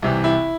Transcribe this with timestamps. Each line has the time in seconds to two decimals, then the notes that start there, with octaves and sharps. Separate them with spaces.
0.02 C2 C3 E3
0.24 E4